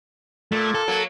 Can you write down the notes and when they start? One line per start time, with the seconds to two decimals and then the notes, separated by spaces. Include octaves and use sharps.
0.52 A#2 A3
0.75 A4
0.88 F#3 A#3